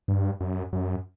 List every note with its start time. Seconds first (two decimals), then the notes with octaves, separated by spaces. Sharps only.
0.08 G2
0.40 F#2
0.73 F#2